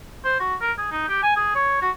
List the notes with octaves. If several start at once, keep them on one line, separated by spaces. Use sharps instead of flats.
C5
F#4
A#4
G#4
D#4
G4
G#5
G#4
C#5
F#4